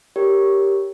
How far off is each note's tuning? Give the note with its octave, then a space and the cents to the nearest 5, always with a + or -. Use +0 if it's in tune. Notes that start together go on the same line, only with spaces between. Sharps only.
G4 +0 A#4 +0 C#5 +0